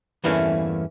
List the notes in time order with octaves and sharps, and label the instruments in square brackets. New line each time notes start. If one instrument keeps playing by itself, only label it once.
[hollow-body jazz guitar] E2 G2 E3 A3 A#3 C#4